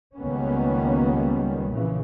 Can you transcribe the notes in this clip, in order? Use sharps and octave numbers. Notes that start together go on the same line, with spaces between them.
C#2 D#3 G3 A#3 B3 C#4
A#1 C#3 E3